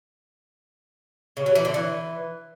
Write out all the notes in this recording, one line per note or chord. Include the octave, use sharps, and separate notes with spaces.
C#3
F#3
E3
D3
E3